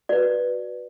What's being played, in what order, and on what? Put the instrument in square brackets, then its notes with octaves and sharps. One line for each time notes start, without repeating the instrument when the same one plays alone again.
[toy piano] F#4 B4 D5